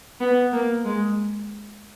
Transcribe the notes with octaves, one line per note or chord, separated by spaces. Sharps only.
B3
A#3
G#3